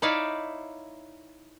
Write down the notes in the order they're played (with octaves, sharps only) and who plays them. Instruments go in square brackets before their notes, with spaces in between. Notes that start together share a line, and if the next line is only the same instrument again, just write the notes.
[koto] D#4 E4 C#5 D5 E5 F5